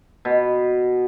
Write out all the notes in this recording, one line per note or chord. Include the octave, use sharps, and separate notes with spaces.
B2